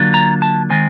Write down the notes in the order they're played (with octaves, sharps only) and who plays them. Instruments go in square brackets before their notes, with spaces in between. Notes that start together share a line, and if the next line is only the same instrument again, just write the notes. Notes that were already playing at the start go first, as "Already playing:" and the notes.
Already playing: [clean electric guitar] D3 F#3 A#3 D4 F4
A#5
A5
D#3 G#3 C4 G#5